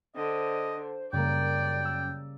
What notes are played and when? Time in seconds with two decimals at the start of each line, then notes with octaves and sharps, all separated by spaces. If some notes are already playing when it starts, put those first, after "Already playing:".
0.16 D3 C5 D#5
1.13 F#2 C#3 G3 A#3 D5 G5
1.85 E6